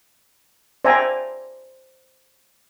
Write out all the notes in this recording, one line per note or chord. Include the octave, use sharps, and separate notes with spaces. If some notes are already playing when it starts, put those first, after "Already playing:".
C5 D5 E5 G5 G#5 A#5